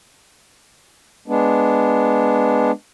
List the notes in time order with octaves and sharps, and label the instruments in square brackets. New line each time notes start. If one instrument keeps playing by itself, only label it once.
[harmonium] G#3 B3 D4